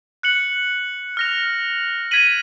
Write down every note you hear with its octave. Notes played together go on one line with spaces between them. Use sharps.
F#6 C#7 F#7
F6 A#6 F7
G#6 B6 D#7 F#7